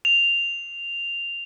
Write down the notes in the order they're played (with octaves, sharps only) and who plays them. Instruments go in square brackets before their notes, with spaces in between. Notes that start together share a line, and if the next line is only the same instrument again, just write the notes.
[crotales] F7